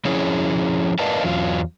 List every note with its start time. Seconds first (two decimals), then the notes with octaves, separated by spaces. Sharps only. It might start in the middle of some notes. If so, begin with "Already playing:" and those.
0.05 F3 C#4 E4 G#4 C#5
0.99 A#4 B4 D5 D#5 F5 A5
1.24 E2 F#3 F4